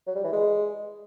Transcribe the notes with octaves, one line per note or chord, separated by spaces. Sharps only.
F#3
G3
E3
G#3